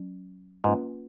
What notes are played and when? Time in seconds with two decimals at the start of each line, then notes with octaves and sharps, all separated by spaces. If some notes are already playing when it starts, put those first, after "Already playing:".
Already playing: F#3 C#4
0.64 G#2 A#3 C#4 F4 B4